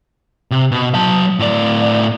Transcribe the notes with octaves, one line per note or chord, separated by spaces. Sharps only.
C3
B2
F#3 A5
A2 D5